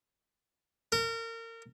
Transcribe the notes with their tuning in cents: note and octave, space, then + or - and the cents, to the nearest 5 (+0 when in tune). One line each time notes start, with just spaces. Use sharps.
A#4 -30